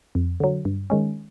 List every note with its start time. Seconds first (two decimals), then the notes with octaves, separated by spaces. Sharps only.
0.15 F2
0.40 D3 F#3
0.65 G2
0.90 D#3 G#3 C#4